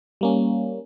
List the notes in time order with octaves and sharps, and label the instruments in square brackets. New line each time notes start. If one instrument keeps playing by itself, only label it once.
[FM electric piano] G3 A#3 C#4